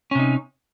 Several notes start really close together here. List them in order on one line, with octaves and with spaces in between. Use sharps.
C#4 C3 D#4